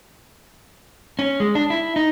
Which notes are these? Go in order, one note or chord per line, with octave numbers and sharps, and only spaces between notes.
C#4
G#3
D4
E4
D#4